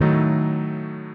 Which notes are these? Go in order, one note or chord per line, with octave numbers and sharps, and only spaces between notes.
A2 D#3 F#3 A3 D#4 A4